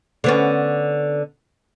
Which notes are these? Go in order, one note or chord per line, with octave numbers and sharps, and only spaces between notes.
D3 B3 C#4